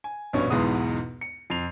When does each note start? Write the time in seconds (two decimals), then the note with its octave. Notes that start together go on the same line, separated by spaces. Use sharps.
0.04 G#5
0.33 A#1 G2 B2 C#4 C#5
0.50 B1 E2 G#2 G#3 B3 D#6
1.21 C#7
1.50 F2 C7 F7